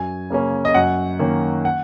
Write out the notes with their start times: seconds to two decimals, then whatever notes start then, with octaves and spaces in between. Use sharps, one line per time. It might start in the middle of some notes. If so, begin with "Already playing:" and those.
Already playing: F#2 G#5
0.30 C#3 A#3 C#4
0.65 D#5
0.74 F#2 F#5
1.19 D#3 A#3 C#4
1.65 F#5